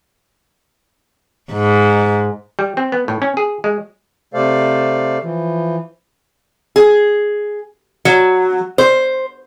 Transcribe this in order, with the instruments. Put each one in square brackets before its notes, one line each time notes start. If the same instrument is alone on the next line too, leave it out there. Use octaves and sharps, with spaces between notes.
[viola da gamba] G#2
[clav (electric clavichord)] G3
C4
B3
A2
C#4
G#4
G#3
[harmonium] C3 A3 A4 C5 D5 F5
E3 F3
[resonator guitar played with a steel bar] G#4
F#3
C5